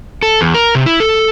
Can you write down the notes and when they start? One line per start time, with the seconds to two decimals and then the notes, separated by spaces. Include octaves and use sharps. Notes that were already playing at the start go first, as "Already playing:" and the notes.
0.23 A4
0.41 E2
0.54 A#4
0.75 C3
0.86 E4
1.00 A4